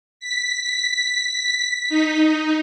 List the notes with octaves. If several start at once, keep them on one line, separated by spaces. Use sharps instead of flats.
B6
D#4